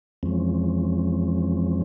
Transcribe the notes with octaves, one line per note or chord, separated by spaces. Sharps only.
F2 E3 F3 G#3 C4 C#4